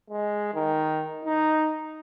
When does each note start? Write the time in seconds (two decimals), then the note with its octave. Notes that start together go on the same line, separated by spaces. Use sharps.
0.10 G#3
0.54 D#3
1.25 D#4